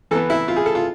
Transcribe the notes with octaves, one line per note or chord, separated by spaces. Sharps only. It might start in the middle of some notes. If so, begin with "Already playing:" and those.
E3 B3 A4
E4
F4
G#4
A4
F4